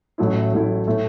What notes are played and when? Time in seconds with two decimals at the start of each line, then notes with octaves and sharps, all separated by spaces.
0.18 A1 A2 F#3 A3 E4
0.52 A1 A2 F#3 A3 E4
0.87 A2 A3